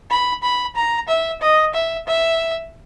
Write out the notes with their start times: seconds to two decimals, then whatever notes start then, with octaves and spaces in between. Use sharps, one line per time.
0.10 B5
0.43 B5
0.76 A#5
1.08 E5
1.41 D#5
1.74 E5
2.07 E5